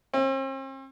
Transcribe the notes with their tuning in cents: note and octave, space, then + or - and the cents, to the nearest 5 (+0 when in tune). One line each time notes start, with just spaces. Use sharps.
C4 +45